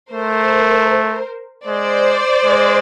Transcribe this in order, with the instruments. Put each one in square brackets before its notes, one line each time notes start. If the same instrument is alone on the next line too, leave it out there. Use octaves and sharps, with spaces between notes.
[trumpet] A3 [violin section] A#4 C5
[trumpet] G#3 [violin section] C5 D5
[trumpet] G#3